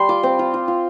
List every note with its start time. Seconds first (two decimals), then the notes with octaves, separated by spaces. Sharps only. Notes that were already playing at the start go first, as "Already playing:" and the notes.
Already playing: G3 C6
0.09 F4 D6
0.23 C4
0.39 F4
0.54 F4
0.68 F4